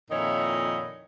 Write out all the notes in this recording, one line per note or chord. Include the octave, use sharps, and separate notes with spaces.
F2 A#2 D#3 E4 C#5 D#5